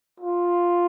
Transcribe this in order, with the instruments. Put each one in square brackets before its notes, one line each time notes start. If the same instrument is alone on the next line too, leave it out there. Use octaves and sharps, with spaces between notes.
[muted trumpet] F4